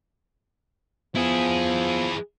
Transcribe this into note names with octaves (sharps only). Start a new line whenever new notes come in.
F3 B3 E4 G#4